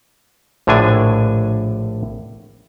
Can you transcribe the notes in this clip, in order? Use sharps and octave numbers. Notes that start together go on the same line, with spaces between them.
A#1 A2 D3 D4 G#5